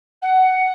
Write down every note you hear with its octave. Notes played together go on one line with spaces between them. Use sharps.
F#5